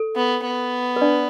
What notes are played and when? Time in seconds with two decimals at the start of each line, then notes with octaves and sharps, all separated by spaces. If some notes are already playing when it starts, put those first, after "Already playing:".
Already playing: A4
0.16 B3
0.45 B3
0.96 B4
1.01 D4 D5